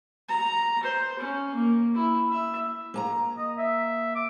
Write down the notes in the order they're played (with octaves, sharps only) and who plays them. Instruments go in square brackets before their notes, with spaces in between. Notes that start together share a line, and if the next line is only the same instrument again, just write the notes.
[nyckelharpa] A#5
C5
C#4
A#3
E4
E5
[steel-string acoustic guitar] A#3 A5 A#5
[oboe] D#5
E5
D6